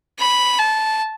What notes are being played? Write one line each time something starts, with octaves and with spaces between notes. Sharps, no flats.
B5
A5